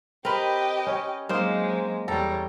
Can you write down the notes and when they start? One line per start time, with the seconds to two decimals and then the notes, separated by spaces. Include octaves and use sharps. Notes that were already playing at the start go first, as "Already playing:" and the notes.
0.25 C4 G4 A#4 B4 D#5
0.87 C#4 C#5
1.29 F#3 G#3 A#3 C4 D#4 A#4 C5
2.08 E2 G3 A4 C#5 A#5